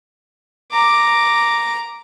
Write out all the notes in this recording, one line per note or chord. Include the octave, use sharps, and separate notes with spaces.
A#5 D6